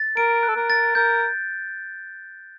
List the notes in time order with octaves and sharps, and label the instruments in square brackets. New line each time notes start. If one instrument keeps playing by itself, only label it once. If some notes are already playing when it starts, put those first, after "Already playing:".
Already playing: [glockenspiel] A6
[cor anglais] A#4 [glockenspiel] D7
[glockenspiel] F#6
[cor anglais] A4
A#4
[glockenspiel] A6
[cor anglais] A#4 [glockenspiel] G6